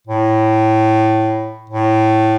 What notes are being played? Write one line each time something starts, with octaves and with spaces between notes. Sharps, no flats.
A2
A2